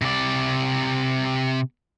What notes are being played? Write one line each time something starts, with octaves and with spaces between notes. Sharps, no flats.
C3 D5